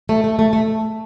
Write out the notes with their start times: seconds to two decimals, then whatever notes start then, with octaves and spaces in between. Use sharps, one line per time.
0.09 A3
0.24 A3
0.39 A3
0.53 A3